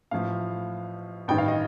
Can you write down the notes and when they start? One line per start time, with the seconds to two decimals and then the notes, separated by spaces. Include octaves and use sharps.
0.11 A1 A2 F3 F5
1.28 A1 G2 D#3 G5
1.38 F5
1.48 D#5